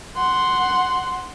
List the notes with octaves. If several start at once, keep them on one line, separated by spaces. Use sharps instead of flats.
F#5 C6